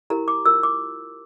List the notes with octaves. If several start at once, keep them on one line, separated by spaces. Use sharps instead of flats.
E4 G4 A#4 A#5
D6
F4 A#4 E6
D6